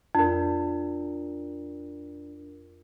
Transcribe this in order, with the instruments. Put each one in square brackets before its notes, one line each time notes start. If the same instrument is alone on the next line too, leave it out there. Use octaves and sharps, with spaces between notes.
[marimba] F2 [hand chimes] D4 A#4